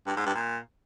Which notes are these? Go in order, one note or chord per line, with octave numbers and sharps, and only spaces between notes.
G2
G#2
G2
A#2